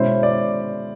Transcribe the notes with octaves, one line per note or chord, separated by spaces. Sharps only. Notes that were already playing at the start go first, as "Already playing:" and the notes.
Already playing: B2 G#3 C#4 E4 C5
D5